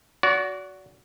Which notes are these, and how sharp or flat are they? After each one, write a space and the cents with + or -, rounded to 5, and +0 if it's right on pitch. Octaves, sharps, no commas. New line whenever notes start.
F#4 +0 D5 -35